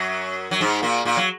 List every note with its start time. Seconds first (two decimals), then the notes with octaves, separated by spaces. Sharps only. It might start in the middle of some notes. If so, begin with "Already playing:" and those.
Already playing: F#2 F#3
0.51 F#3
0.60 G#2 G#3
0.82 A#2 A#3
1.05 A#2 A#3
1.17 F#3